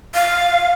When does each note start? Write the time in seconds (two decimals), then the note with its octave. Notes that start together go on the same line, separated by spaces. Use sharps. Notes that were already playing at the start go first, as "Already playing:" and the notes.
0.14 F5